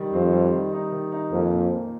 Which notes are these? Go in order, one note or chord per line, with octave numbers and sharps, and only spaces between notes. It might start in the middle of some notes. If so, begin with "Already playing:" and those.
Already playing: D#3 G3
F2 C4
G3
D#3
D#4
D#3
D#4
F2 A#3
A#2
A#3